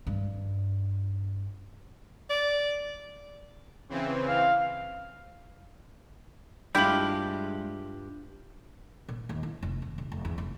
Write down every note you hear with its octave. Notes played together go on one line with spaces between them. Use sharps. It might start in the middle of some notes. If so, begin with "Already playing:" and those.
G2
D5
C#3 E3 C4
F5
G2 G3 G#3 E4 F4 G4 G6 F#7
A#2
D#2
E4
F1
D#2
A#1
F1
E2
F1